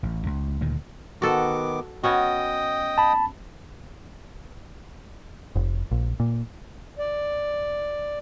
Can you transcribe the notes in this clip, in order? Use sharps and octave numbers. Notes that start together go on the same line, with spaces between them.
A1
C#2
D2 A#2 D#3
D#3 B3 F#4 A4 D6
B3 C#4 F#4 D#5 G5 D#6
A5 B5
F1
A#1
A#2
D5